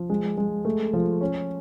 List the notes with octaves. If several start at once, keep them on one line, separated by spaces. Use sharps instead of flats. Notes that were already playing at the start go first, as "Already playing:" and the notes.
Already playing: F3
G#3
G#3
A3
F3
C#4